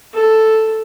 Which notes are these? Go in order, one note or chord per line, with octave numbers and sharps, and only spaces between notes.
A4